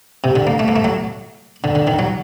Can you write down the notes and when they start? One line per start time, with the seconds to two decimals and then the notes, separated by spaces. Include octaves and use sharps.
0.24 C3
0.36 D3
0.47 A#3
0.59 A3
0.68 A#3
0.76 A3
0.85 F#3
1.64 D3
1.75 D3
1.87 D#3
1.99 F#3